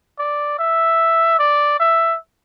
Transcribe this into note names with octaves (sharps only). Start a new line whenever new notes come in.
D5
E5
D5
E5